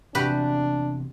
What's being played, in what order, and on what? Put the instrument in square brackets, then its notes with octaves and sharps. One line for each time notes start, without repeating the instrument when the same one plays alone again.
[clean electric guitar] E2 C3 [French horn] D4 [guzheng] F#4 G4 B4